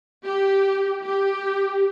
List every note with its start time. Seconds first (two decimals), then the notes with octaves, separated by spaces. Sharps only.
0.25 G4
1.03 G4